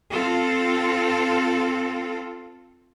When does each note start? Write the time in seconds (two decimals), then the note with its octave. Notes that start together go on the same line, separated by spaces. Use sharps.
0.11 C4 F4 A4